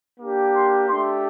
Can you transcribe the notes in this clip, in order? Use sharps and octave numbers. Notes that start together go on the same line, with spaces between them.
A#3 D4 G4
C6
A3 D4 G4 C6